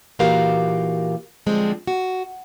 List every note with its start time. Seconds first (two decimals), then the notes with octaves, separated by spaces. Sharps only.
0.19 A#2 E3 F#4 G4 A#4 F5
1.46 D3 F3 G3 G#3 C4
1.87 F#4